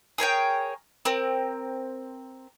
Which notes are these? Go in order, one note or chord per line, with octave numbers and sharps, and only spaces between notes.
G#4 A#4 C#5 G5
C4 A#4